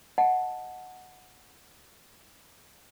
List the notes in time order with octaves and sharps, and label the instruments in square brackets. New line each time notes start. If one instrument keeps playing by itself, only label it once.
[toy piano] D#5 F#5 A5